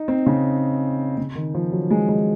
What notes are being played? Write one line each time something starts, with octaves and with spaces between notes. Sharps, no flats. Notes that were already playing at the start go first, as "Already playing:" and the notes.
Already playing: D#4
C4
C#3
C#3
D#3
F3
F#3
G#3
G#3